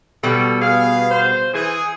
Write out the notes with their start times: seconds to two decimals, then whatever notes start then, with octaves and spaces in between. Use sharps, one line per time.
0.23 B2 G3 A4
0.61 B3 G#4 F5
1.11 C5
1.54 E3 G#4